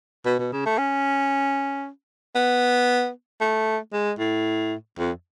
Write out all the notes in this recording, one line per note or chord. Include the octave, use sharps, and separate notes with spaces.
B2
B2
C#3
A3
C#4
B3
A3
G#3
A2
F2